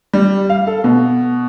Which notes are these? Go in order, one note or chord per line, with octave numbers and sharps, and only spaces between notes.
G3
F5
A4
B2